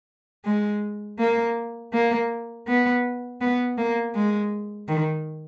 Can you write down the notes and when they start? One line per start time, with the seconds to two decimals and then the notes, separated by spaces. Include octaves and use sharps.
0.45 G#3
1.19 A#3
1.93 A#3
2.67 B3
3.41 B3
3.78 A#3
4.15 G#3
4.88 D#3